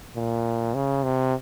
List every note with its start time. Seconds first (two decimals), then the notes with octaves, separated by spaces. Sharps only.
0.16 A#2
0.74 C#3
1.04 C3